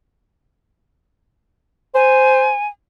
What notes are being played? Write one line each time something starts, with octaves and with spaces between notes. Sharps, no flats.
C5 G#5